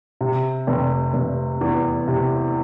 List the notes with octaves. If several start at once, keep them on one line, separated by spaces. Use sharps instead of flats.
C3
F1
F1
E2
C3